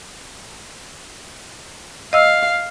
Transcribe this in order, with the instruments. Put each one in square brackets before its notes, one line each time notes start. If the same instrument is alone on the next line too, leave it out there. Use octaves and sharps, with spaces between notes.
[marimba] D#5 E6 [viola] F5